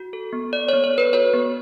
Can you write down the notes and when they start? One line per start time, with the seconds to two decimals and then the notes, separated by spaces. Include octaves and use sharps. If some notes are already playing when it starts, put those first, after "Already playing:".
Already playing: F#4
0.13 A4
0.33 B3
0.53 A4 D5
0.68 C#5
0.73 B3
0.84 C#5
0.93 A4 B4
1.13 F#4 C#5
1.34 B3